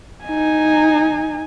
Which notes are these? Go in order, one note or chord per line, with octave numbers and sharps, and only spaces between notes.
D#4 G#5